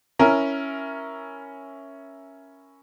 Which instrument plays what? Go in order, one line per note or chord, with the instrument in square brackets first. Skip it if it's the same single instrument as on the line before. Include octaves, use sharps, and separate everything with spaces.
[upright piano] C#4 E4 A#4 A#5